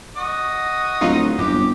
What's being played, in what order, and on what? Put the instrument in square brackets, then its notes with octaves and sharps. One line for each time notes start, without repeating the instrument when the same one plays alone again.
[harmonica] F#4 D#5
[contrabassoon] D1 [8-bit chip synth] F#3 D#4 F4
[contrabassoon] G1 [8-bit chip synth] F#2 [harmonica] G4